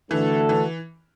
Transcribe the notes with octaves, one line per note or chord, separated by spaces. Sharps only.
D3 E3 A3 D4 F#4 A4
E3